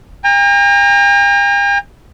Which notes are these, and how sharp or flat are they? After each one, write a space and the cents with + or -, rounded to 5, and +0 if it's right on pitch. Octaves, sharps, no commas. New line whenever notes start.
G5 +45 A#5 -5